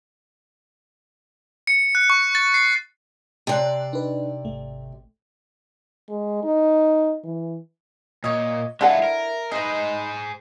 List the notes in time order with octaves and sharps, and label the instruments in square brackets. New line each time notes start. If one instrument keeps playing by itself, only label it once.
[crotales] C#7
F#6
C#6
A6
C7
[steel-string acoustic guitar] C3 D5 [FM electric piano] A5 C6 F#6
[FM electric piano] D4 D#4 B4
G#1 A3
[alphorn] G#3
D#4
E3
[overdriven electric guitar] A#2 [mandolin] C#5 D#5
[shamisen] D3 A4 F#5 [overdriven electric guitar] G#3 F4 [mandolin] E4
[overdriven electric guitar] A#4
[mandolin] D#4 B4 [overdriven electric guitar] G#4 C5